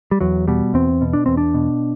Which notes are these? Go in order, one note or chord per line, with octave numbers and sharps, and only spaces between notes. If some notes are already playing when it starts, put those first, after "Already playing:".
G3
E2 F#3
B2 G3
E2 C4
B2
D4
E2 C4
D4
B2